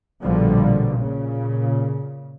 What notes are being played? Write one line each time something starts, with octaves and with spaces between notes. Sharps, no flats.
A#1 B2 D3 F3 G3 A#3
A#2 C#3